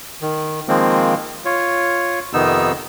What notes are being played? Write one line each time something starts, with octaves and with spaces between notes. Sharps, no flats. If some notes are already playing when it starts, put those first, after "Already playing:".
D#3
D#3 F3 G#3 A#3 C4
F4 C#5
F2 C3 D#3 B3 D#4 E6